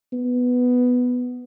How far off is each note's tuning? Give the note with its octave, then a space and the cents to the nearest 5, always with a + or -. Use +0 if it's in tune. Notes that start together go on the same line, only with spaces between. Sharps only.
B3 +5